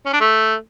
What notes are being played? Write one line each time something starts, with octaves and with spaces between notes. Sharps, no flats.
C#4
D4
A3